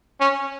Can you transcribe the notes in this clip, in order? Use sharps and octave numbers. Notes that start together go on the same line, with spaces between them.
C#4